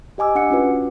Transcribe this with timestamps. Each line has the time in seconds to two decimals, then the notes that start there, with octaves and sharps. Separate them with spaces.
0.18 G4 D#5 G#5 D6 E6
0.35 D4 F#5 D6 C#7
0.50 C#4 F4 F#4 B4
0.71 B4